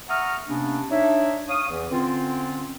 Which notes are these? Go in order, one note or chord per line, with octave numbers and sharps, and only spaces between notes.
E5 F#5 A#5 C#6 D#6 F6
C3 A#3 B3 C#4 D4
D4 D#4 C#5 E5
C#5 F5 D#6
E2 E3
D3 C4 C#4 F4